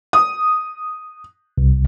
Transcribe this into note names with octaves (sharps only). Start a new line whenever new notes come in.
D#6
C2